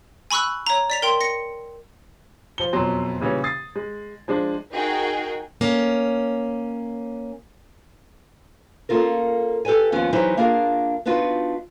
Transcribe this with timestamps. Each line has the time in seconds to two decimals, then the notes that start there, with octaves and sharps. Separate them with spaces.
0.31 G#5 B5 C#6 E6 F#6
0.66 C#5 A#5
0.90 D5 B6 F7
1.02 A#4 G5 C6
1.21 A#6 C#7
2.58 F3 G7
2.73 E1 F2 B2 F#3 C6
3.20 A#2 C#3 E3 G3 C#4
3.44 D#6 A6 C7
3.76 G#3
4.28 F3 G#3 D4
4.72 D#4 F#4 G#4 A#4 G5
5.61 A#3 C#4
8.89 A#3 C#4 F4 A4 A#4
9.65 G4 A4 B4 C#5 G#5
9.92 D#2 F3 B3 C#4
10.13 E3 F#3 D#4 E4 G4 C5
10.37 A#3 D4 F4 G#4 A#4
11.06 B3 D4 D#4 F4 F#4 B4